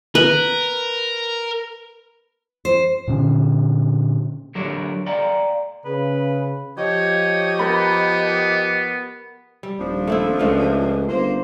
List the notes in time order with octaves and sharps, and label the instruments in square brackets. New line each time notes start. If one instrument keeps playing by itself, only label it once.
[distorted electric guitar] A#4 [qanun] B4
[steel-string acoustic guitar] C5
[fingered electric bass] A#2 D3 C#4
[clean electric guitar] D3 F#3 G4 A#4 C#5
D5 F5 G5 A#5
[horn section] C#3 [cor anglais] B4
[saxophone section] F3 G4 D#5 [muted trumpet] C#5
[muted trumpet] B3 [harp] A#4 B5
[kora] G3
[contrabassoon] D#1 [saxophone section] F3 D4
[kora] A3 C4 E4
[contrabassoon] C#2 [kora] A3 F#4 F5
[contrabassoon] G1 [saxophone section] A#3 C5